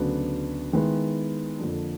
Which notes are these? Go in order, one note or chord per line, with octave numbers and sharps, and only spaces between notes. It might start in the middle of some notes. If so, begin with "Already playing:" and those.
Already playing: D2 C#3 F#3 B3 D4
D#3 G#3 B3 E4
F2 D3 F3 A#3 D4